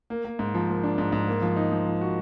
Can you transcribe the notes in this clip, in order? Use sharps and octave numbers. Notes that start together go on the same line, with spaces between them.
A#3
A#3
G#2
F3
A#3
D4
G#2
G#2
A#3
F3
D#4
F3
F3
F#4